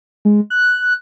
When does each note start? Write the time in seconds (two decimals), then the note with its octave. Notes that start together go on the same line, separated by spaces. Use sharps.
0.25 G#3
0.50 F#6